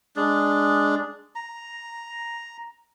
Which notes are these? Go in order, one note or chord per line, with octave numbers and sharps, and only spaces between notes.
G#3 D4
A#5